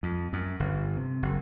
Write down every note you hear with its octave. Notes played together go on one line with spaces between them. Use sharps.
F2
F#2
G1
C3
F#1